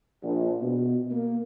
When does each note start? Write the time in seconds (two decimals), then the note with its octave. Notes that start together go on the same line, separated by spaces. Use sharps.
0.23 A#1
0.61 B2
1.11 A#3